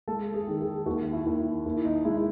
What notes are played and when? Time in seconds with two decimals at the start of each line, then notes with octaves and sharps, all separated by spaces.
0.08 G#3 A4
0.34 G#4
0.47 D#3
0.61 G#4
0.86 D#2 F#4
1.13 E4
1.26 D#2
1.39 E4
1.66 D#2 E4
1.85 D#4
2.05 G#3 E4